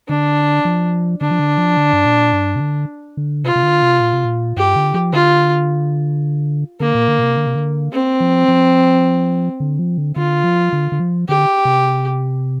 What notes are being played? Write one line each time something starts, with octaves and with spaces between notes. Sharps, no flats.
D3 D4
F3
D3 D4
F3
D3
F3
D3
G2
A#2
G2
C3
D3
D3
C3 F4
C3
D3
C3
A#2
C3
A#2
G2 G4
D3
F3
D3 F4
D3 A#3
A#2
D3
A#2
C3
D3
C3
D3
C4
F3
F3
D3
F3
D3
D3 F4
F3
D3
D3
F3
D3 G4
C3